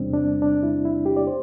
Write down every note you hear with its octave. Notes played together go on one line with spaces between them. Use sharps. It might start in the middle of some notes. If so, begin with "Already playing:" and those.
Already playing: E2 C3 E3 G3 C4 D4
D4
D4
E4
E4
G4
D5
C5